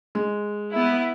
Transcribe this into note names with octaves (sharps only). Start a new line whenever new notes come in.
G#3
B3 E4